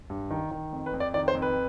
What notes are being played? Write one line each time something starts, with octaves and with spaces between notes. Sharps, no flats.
G2
D#3
D#3
F2
B4
F2
D5
D#3 D5
C5
F2
B4